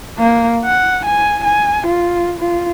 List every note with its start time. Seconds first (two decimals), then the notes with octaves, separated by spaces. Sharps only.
0.19 A#3
0.65 F#5
1.06 G#5
1.45 G#5
1.87 F4
2.39 F4